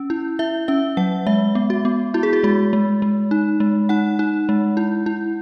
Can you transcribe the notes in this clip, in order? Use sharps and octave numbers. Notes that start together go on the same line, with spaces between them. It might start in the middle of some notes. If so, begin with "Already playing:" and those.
Already playing: C#4
E4
E4 E5
C#4 E5
F#3 F#5
G#3 E5
B3
F#4
B3
E4 F#4
G#4
F#4
G#3 F#4
G#3
G#3
D#4
G#3
D#4 F#5
D#4
G#3
E4
E4